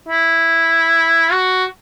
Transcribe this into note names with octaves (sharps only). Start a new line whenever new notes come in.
E4
F#4